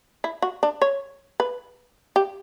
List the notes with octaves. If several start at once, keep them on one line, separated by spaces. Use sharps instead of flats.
E4
F#4
D4
C#5
B4
G4